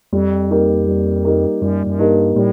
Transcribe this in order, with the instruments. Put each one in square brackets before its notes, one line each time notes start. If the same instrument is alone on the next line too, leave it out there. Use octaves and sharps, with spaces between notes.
[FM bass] F2 [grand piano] G3
[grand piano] A#3 D#4 G4 A#4
G3
A#3 D#4 G4 A#4
[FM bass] F#2 [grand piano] G3
[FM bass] F#2
[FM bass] G2 [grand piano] A#3 D#4 G4 A#4
[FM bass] A2 [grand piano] G3